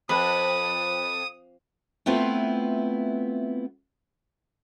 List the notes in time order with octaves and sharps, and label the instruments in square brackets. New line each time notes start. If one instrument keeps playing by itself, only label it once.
[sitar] F2 [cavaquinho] B4 [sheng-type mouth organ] D#6
[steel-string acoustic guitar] A3 B3 C4 E4 F4 B4